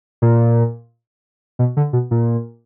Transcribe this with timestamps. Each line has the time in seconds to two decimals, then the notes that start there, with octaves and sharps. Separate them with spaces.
0.22 A#2
1.59 B2
1.77 D3
1.93 B2
2.11 A#2